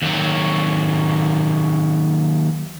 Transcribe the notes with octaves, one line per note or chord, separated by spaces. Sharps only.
D#2 F#3